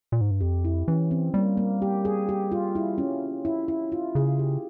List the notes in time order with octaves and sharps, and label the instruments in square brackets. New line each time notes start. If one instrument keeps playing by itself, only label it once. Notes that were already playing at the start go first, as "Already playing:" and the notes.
[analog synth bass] A#2
G#2
G2
[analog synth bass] F2 [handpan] G4
[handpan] E4
[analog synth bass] E3 [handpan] C#4
[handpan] C4
[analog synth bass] G3 [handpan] A#3
[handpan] A#3
G4
G#4
G4
F4
E4
C#4
E4
E4
F4
[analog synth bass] C#3 [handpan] G#4
[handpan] G4